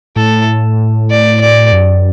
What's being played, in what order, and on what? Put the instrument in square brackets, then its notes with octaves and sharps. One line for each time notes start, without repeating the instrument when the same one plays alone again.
[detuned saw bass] A2 [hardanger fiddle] A4
[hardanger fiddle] D5
D5
[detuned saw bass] F#2